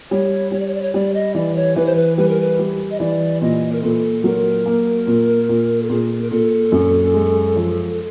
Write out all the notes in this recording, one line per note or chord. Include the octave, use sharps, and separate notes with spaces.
G3 C#5
G3 C#5
D5
C#5
D5
C#5
G3 D5
D#5
E3 D5
C#5
E3 B4
C5
B4
G3 B4
A#4
B4
G3
D#5
E3 D5
A#2 D#5
A#4
A#2 A4
F#3 A#4
A#3
A#2
A#2
A4
A#2 G#4
A#4
A#2 A4
F#2
G#3
F3